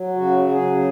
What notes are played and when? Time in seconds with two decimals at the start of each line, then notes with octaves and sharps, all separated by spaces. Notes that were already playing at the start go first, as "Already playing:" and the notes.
Already playing: F#3
0.16 C#3 F#4
0.39 F#3
0.51 G#4
0.62 C#3